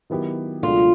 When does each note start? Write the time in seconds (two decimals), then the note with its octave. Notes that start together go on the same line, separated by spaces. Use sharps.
0.10 D#3 F#3 B3 E4 G4
0.63 C#2 B2 F#3 A3 D4 F4